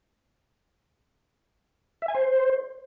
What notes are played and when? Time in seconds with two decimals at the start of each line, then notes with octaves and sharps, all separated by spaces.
2.02 E5
2.08 G#5
2.14 C5